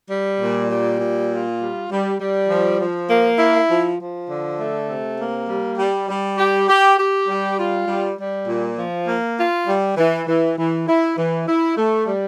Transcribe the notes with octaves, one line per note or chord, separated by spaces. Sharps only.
G3
A#2
G3
A#2
F4
G3
G3
G3
F3
F3
A#3
E4
F3
F3
D3
A3
C3
A#3
G3
G3
G3
G4
G4
G4
G3
F4
G3
G3
A#2
F3
A#3
F4
G3
E3
E3
E3
E4
E3
E4
A3
G3